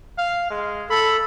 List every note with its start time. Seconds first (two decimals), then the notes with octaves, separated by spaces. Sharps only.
0.18 F5
0.50 G#3
0.90 A4 B5